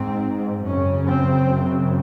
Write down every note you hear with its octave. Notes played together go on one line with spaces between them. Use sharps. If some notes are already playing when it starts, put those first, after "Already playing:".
Already playing: G#2 C4
F#2 C#3 C#4
C4
F#2 C#3